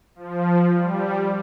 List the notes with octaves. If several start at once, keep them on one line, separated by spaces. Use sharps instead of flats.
F3
G3